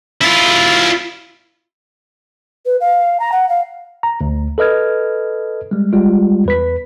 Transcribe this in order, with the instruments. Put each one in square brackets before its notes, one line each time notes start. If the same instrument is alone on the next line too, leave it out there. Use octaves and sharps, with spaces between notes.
[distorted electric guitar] E4 F4
[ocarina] B4
F5
A#5
F#5
F5
[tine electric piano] A#5
D2
A4 B4 D#5 F6 G#6
G3 G#3
G3 G#3 F4
E2 B4 B6